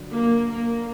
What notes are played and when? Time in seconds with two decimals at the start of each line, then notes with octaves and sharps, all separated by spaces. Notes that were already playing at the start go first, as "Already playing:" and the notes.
Already playing: G2 D3 F#3
0.12 A#3
0.49 A#3